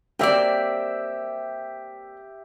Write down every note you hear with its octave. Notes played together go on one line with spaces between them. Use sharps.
A#3 C4 G4 D5 E5